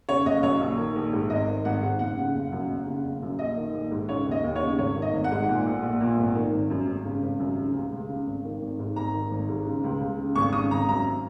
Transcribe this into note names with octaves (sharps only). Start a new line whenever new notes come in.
C#3 C#5
F#1 D#5
F#2 C#5
A#1
D#3
A#1
G#2
G#1 D#5
D#3
G#1 F#5
G#2
F#1 F#5
C#3
F#1
F#2
F#1
C#3
F#1
F#2
A#1 D#5
D#3
A#1
G#2
C#3 C#5
D#2
D#5
D#2
C#5
C#3
G#1 C#5
D#3
D#5
G#1
F#5
G#2
A#2
A#1
A#1
A#2
G#1
D#3
G#1
F#2
G#1
C#3
G#1
F#2
C#3
C#2
C#2
C#3
G#1
D#3
G#1
G#2
G#1 A#5
D#3
G#1
G#2
C#3
C#2
C#2
C#3
G#1 C#6
C#3 D#6
G#1 A#5
F#2 A#5